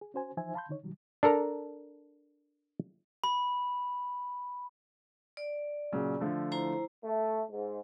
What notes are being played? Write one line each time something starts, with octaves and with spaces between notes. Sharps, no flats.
G#4
C#4 F#4 C5 G#5
E3 F3 D#4 C5 E5 G#5
F5 A5 B5 C6 G6
D3 D#3 D#4 C#5
B2 D#3 F#3 G3
D4 A4 A#4 A#5
B5
D5
A#2 C#3 F#3
D3 F3 A3
E4 C5 A#5
A3
G#2